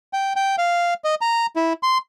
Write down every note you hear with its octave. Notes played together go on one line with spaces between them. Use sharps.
G5
G5
F5
D#5
A#5
E4
C6